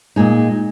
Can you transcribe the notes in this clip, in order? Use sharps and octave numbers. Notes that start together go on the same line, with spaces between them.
A#2 G#3 D#4